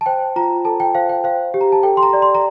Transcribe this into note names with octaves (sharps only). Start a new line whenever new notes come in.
A5
C5 G5
F4 A#5
A4 A5
G5
C5 F5
G5
C5 F5
G4
A#5
A5
A4 G5
C6
A#5
D5
C6
A#5